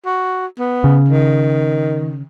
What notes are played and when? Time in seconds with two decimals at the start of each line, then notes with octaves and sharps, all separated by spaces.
0.06 F#4
0.59 B3
0.84 C#3
1.08 D#3